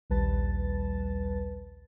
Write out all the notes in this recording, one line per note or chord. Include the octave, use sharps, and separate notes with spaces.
A#1 D#2 G3 B4 A5 A6